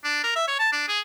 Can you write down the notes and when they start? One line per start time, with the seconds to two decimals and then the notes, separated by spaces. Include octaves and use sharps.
0.04 D4
0.24 A#4
0.36 E5
0.48 C#5
0.59 A5
0.72 D4
0.88 G#4